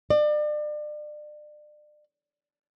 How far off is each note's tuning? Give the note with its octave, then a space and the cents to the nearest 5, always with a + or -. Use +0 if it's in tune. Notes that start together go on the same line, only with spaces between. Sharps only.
D5 +35